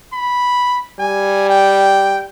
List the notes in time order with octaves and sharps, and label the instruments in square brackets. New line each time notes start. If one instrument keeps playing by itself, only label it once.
[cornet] B5
[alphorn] G3 [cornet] G#5
[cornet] G5